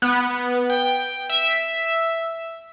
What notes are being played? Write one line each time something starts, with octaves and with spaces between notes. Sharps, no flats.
B3
G5
E5